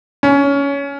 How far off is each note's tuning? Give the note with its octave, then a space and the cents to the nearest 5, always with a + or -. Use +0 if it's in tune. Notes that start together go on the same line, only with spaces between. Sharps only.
C#4 +15